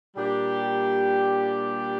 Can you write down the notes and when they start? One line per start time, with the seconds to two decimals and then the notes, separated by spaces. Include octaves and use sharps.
0.16 A#2 G3 D4 G4